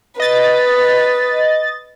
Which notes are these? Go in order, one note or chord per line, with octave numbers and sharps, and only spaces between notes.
B4 D#5 A6